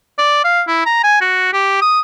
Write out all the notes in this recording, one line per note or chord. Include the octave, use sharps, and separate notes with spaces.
D5
F5
E4
A#5
G#5
F#4
G4
D#6